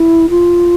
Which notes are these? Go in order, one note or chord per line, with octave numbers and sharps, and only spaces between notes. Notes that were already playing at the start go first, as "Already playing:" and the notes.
Already playing: E4
F4